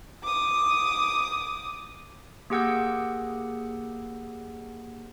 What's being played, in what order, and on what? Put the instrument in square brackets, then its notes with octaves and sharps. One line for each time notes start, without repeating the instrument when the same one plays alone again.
[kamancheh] D6 D#6
[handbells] A#3 G4 G#4 F#5 E6 G6